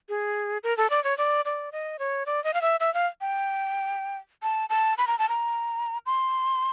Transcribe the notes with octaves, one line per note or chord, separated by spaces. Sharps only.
G#4
A#4
A4
D5
C#5
D5
D5
D#5
C#5
D5
D#5
F5
E5
E5
F5
G5
A5
A5
B5
A#5
A5
A#5
C6